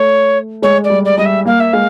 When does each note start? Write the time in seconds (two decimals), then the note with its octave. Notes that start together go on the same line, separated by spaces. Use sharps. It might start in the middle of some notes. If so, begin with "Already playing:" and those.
Already playing: A3 C#5
0.62 G#3 C#5
0.84 D5
0.90 G3
1.05 D5
1.17 G3 D#5
1.25 E5
1.45 A#3 F5
1.59 E5
1.72 G#3 F5